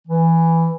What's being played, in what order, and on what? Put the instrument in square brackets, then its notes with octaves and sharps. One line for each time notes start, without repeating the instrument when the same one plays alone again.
[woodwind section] E3